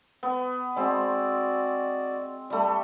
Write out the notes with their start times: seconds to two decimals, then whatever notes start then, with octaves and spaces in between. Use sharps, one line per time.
0.23 B3
0.76 G#3 C4 F#4 D5
2.50 G3 A3